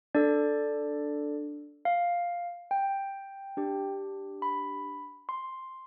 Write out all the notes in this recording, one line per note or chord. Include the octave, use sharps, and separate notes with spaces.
D4 A4 D5
F5
G5
D4 G4
B5
C6